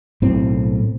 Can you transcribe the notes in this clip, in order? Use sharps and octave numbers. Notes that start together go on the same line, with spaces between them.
B1 A2 C4